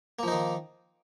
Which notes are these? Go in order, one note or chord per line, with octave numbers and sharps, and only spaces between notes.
D#3 F3 A#3 D#4